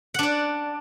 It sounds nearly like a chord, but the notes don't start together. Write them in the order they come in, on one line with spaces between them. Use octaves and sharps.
F#5 D4 D5